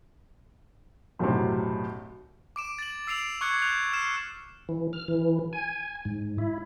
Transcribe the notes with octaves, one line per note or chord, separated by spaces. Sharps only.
B1 F#2 A2 C3
D6 D7 E7
A6 F#7
E6 C7 D7 F7 F#7
C#6 D6 F#6 G#6 C#7
F#6 G6 F7
F6 C7 E7
E3
F6
E3
G#5
G#2
E4